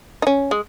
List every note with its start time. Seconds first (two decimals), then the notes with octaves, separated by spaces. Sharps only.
0.22 D#4
0.27 C#4
0.51 G#3